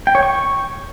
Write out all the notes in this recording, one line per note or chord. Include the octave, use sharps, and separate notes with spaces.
G5
C#5
C#6